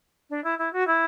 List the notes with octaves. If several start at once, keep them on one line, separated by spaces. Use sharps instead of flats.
D4
E4
E4
F#4
E4